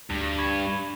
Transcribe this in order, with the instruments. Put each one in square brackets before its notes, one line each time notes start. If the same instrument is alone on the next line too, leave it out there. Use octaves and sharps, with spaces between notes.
[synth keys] D2 [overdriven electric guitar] G2
[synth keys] B5 C#6 G#6